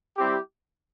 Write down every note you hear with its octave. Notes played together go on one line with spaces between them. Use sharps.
G3 C4 E4 G4